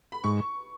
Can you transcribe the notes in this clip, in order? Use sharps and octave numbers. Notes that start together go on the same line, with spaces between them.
B5
G#2 C#6